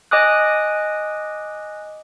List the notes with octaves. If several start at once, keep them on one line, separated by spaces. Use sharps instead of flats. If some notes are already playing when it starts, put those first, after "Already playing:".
D#5 G#5 D6 D#6 F#6